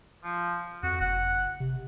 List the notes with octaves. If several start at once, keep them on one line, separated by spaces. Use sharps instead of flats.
F3
F2 F#4
F#1 F#5
C3